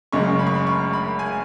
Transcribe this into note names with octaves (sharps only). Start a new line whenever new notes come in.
F#1 F#2 C#3 G#3 C#6
B5
C#6
B5
C#6
B5
G#5